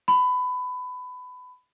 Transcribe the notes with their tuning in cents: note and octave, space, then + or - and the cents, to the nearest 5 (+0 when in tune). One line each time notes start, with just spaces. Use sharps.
B5 +20